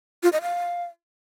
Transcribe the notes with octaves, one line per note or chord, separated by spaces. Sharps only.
F4
D#5
F5